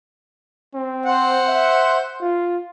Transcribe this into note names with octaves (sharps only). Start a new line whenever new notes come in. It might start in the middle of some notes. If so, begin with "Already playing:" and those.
C4
C5 F#5
E5
F4